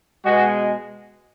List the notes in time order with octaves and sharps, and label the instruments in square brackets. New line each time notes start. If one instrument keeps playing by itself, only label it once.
[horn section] B2 G#3 F#4